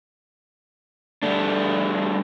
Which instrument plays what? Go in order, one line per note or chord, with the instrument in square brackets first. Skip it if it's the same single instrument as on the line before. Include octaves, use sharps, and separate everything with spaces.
[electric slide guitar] G3 A3 D4